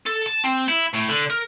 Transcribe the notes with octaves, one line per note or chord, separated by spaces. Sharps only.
A4
A5
C4
E4
A2
D3
A#4